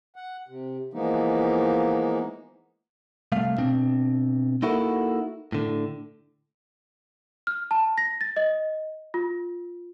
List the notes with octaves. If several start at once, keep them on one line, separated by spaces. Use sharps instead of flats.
F#5
C3
E3 F3 G#3 A#3 B3 D#4
C2 A3 F5
B2 C4 D4
A#3 D#4 E4 F#4 A4 A#4
A2 D3
F6
A5
A#6
A6
D#5
F4